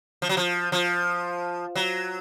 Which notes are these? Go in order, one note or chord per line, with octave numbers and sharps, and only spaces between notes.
F3
F#3
F3
F3
F#3